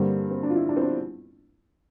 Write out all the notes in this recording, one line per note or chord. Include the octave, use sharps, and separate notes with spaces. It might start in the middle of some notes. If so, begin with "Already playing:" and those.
Already playing: G2 D3 G3 A#3 C4
C4
D4
F4
E4
D4
C4
D4